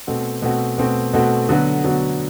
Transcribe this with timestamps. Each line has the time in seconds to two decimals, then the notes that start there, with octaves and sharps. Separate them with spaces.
0.07 B2 A3 C4 F#4
0.42 B2 A3 C4 F#4
0.78 B2 A3 C4 F#4
1.13 B2 A3 C4 F#4
1.49 D3 F#3 B3 F#4
1.84 D3 F#3 B3 F#4